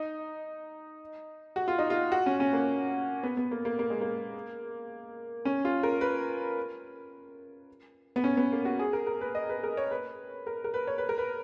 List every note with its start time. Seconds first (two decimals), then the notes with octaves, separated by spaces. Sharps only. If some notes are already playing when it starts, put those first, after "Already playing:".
Already playing: D#4
1.56 F#4
1.68 F4
1.79 D#4
1.90 F4
2.12 F#4
2.26 C#4
2.40 C#4
2.53 A#3
3.23 B3
3.37 B3
3.51 A#3
3.65 A#3
3.79 A#3
3.90 G#3
4.01 A#3
5.45 C#4
5.65 F4
5.83 A#4
6.01 B4
8.16 B3
8.24 C#4
8.37 B3
8.52 A#3
8.65 F#4
8.79 G#4
8.93 A#4
9.07 A#4
9.21 B4
9.35 D#5
9.49 B4
9.63 A#4
9.77 C#5
9.91 B4
10.47 A#4
10.64 A#4
10.74 B4
10.87 C#5
10.98 B4
11.09 A#4
11.18 B4